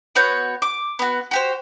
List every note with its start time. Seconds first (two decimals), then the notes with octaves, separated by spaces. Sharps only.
0.15 B3 F#4 C#5 G6
0.62 D6
0.99 B3 F#4
1.31 F#4 G4 C5